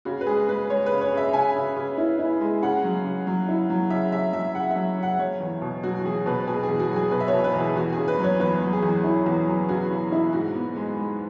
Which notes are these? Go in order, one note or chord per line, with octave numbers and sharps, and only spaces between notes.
C#3 F#4
B4
G#3 G#4
G#3 B4
G#3 C#5
B4
C#3
C#5
C#3 E5
C#3 G#5
C#3
C#3
E4
E4
G#3
C#3 F#5
F#3
C#3
F#3
E4
F#3
C#3 E5
C#3 E5
F#3 E5
C#3 F#5
E5
F#3
C#3
F#5
F#3 C#5
E2
B2
F#3 F#4
E2 G#4
B2 B4
B2 G#4
G#4
E2
F#4
F#3
G#4
B2 B4
E5
C#5
B2
B4
E2
G#4
E2 F#4
C#3 G#4
B4
F#3
C#5
E2 B4
F#3
G#4
E2
E4
E2
F#3
C#3 F#4
C#3
E4
G#2 F#4
B3
G#3
G#3